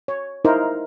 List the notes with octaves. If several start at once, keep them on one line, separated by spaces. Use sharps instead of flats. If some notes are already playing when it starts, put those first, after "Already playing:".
C#5
D#4 E4 A#4 C5